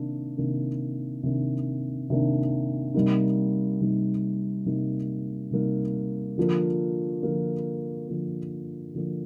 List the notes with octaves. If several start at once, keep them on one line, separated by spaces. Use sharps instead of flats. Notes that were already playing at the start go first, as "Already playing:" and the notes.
Already playing: C3 D#3 A#3 D4
C3 D#3 A#3 D4
C3 D#3 A#3 D4
C3 D#3 A#3 D4
C3 G3 A#3 D#4
C3 G3 A#3 D#4
C3 G3 A#3 D#4
C3 G3 A#3 D#4
D3 F3 A#3
D3 F3 A#3
D3 F3 A#3
D3 F3 A#3